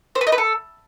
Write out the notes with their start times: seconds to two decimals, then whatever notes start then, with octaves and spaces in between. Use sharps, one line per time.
0.15 C5
0.21 B4
0.27 D#5
0.32 B4
0.38 A4